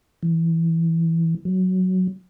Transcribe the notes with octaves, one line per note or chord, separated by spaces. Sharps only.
E3
F#3